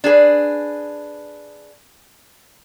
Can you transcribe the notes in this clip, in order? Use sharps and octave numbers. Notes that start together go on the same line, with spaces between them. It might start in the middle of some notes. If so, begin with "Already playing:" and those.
D4 G#4 A4 B4